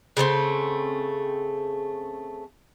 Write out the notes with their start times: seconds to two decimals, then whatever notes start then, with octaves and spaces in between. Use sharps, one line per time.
0.17 C#3 A3 B3 C4